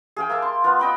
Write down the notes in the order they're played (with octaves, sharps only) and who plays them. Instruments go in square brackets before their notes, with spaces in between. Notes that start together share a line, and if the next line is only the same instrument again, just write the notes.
[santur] G#4 F5 G5
A#3 E5 A5
C6
B3 F4
D#5 G5 B5